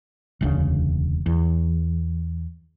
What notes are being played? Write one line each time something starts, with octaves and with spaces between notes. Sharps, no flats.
E1 D2 C#3
E2